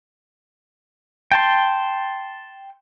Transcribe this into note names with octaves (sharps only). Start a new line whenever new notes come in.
G5 A5 C6